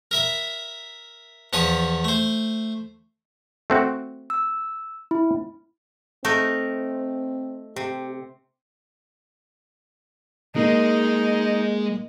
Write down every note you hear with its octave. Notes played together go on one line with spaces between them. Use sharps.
A#4 E5 B5
E2 F3 C#5 A5 B5 D#6
A3 C5
A3 C4 F#4
E6
E4
A3 C4 D#4 A#4
C3 G4
G#3 A#3 D#4 A#4